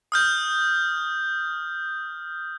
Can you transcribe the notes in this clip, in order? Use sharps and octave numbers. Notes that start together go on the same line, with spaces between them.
D#6 F6 G6